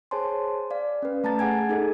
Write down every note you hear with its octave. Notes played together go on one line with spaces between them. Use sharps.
G#4 C5 C#5 G#5 A5 C6
D5 F5
C#4 B4
A3 A5 A#5 A6
G#4 F#5 G#5 G#6
D#4 G#4 A4 D#5